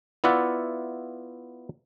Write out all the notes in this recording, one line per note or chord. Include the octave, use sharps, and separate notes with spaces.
B3 E4 F4 D5 E5 F#5